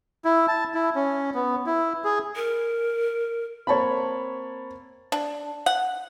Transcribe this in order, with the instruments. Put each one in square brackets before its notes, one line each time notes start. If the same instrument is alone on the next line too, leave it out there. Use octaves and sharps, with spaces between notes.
[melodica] E4
A5
E4
C#4
B3
E4
G#4
[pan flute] A#4
[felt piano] A#3 C4 A5 [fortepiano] C#5 B5
[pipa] D4
F#5